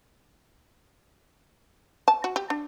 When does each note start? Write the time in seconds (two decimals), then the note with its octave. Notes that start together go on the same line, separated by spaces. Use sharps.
2.08 A5
2.24 F#4
2.36 G4
2.50 D4